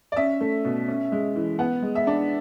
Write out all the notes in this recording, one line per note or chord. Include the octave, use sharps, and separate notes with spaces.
D5
C#4 E5
A3
B2
C#4
G#3
E3
B3 F#5
G#3
E5
D4